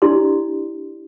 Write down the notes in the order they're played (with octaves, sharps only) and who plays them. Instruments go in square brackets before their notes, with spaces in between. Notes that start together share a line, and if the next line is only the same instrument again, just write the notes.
[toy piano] D4 E4 G4 D5 C6